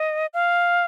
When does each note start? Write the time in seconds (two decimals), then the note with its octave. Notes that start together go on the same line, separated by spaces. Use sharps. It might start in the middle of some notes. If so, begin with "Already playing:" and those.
Already playing: D#5
0.34 F5